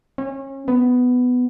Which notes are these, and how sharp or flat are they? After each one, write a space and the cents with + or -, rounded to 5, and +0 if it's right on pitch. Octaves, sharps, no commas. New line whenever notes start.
C#4 -30
B3 +10